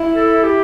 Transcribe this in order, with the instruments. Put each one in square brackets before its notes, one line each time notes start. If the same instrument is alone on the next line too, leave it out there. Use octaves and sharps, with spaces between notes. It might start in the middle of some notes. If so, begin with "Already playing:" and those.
Already playing: [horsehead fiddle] E4
[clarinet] A4
G4